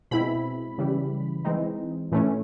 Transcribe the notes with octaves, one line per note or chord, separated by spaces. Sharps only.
B2 G#3 C4 E4 B5
C#3 E3 G3
E3 G#3 C4 D#4
A2 E3 A3 C#4